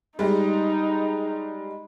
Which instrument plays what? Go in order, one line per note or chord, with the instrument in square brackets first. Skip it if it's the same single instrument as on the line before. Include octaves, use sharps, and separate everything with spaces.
[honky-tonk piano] G3 G#3 [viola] D#4